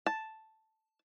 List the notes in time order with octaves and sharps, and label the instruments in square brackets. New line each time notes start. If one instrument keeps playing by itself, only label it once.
[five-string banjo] A5